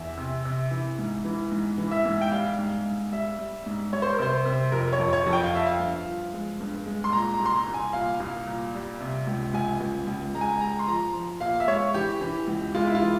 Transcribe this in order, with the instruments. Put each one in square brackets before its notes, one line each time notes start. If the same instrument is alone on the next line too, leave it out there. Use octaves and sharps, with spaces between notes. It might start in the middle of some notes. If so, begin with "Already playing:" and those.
Already playing: [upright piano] E2 E5
C3
C3
E3
G#2
E3
G#2
E3
E5
G#2
G5
G3 F5
G#2
G#2
G3 E5
G3
G#2
G3 C#5
C5
A#4
C3 C5
C3
F2 A#4
C#5
F2
C#5
F2
G5
F5
F3 E5
F5
G2
F3
G#3
G2
G#3
C6
A#2 A#5
A#5
C2
C6
A#5
C2
G#5
A#2 F5
C2
A#2
G3
C3
C#2
C#2 G#5
C#2
C#2
G#3 A#5
G#5
A#5
G#3 A#5
C6
F3 A#5
F3
A#2 F5
E5
G#3 C#5
E3 G4
E3
C#2
G#3 F4
E4
F4
E3